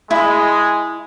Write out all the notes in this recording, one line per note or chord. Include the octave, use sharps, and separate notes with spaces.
G#3 E4